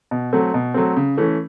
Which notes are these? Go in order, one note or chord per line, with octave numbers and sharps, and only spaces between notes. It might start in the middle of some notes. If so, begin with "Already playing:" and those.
B2
F#3 A3 C4
B2
F#3 A3 C4
C#3
E3 A3 C#4